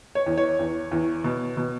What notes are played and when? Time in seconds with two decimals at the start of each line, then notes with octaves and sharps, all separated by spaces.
0.15 C#5
0.26 E2
0.37 C#5
0.59 E2
0.91 E2
1.24 B2
1.57 B2